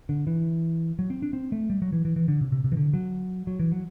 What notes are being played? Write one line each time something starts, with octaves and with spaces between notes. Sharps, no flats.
D3
E3
F#3
C4
D4
C4
A3
G3
F#3
E3
E3
E3
D3
C3
C3
C3
E3
D3
F#3
F#3
E3
F#3